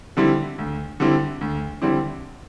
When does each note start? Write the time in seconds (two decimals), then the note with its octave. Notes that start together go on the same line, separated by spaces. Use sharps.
0.17 D3 G3 C4 E4
0.58 D2
1.00 D3 G3 C4 E4
1.41 D2
1.82 D3 G3 C4 E4